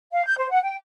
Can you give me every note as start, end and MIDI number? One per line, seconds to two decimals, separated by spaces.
0.12 0.25 77
0.26 0.36 91
0.38 0.49 72
0.50 0.62 78
0.63 0.75 79